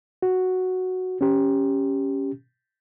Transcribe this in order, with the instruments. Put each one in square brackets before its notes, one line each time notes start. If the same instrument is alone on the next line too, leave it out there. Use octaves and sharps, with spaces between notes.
[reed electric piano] F#4
C#4 G4